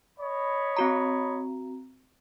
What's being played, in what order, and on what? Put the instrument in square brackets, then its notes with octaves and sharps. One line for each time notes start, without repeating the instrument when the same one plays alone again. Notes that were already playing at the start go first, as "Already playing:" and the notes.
[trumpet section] C#5 D#5 B5
[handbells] C4 F#4 A#5